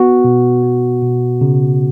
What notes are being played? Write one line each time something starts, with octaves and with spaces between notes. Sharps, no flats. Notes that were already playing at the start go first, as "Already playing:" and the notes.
Already playing: B3 F#4
B2
B3
B2
C#3